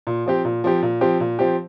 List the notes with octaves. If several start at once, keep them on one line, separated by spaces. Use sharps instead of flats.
A#2
F3 C4 G4
A#2
F3 C4 G4
A#2
F3 C4 G4
A#2
F3 C4 G4